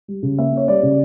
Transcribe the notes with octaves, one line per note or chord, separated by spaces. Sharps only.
G3
C#3
A#3 E5
C#4 C#5
G3 D5
C#3